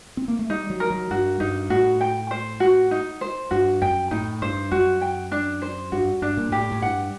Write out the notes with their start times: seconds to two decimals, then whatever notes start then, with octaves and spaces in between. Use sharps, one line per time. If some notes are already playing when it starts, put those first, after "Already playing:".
0.17 C4
0.28 A#3
0.39 A3
0.50 G3 D#4
0.70 F#3
0.80 A#4
0.90 F#3
1.11 G2 F#4
1.40 G2 D#4
1.70 A2 F#4
2.01 G5
2.31 C5
2.60 F#4
2.91 D#4
3.21 C5
3.51 G2 F#4
3.82 F#2 G5
4.11 A2 D#4
4.42 G2 C5
4.71 F#2 F#4
5.01 G5
5.32 D4
5.62 C5
5.92 G2 F#4
6.22 G2 D4
6.37 A#2
6.52 A2 G4
6.72 A2
6.82 G2 F#5